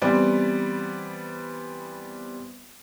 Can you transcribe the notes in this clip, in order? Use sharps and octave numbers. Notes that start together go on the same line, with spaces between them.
E3 G3 B3 C4 D5